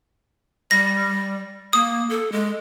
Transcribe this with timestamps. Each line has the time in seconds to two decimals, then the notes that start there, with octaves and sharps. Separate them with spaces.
0.71 G3 A#6
1.73 A#3 D#6
2.10 A4
2.32 G#3